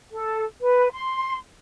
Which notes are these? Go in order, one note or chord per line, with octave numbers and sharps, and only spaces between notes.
A4
B4
C6